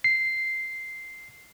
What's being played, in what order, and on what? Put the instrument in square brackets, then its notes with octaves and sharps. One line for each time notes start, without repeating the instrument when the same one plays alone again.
[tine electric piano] C7